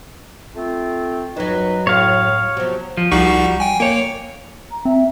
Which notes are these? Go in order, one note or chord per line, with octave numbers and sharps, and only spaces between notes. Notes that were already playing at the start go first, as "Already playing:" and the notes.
A3 C4 F4
F#2 F#3 D#4 B4
A2 C#5 F5
C3 F3 F#3 B3
F3
C2 F3 G3 D#4 F#4 C#6
G5 G#5
A#3 A#4 C#5
A#5
C4 E5